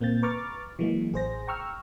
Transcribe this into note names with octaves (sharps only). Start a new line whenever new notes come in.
A#2 A#3 C4 G6 A6
B4 A#5 C#6 D6 F6 A6
E3 F#3 G#3 A#3
A1 G#4 C5 A#6
G5 A#5 C#6 E6 F6